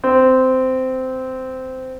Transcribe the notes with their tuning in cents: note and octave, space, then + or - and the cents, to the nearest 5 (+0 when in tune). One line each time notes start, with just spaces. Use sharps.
C4 -15